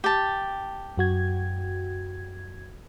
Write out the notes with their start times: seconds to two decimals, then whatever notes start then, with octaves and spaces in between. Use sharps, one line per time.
0.04 G4 A5
0.97 F#2 F#4 G#6